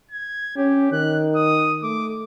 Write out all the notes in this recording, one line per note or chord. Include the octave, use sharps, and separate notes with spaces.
G#6
C#4 G4
D#3 F#6
D#6
A3 D6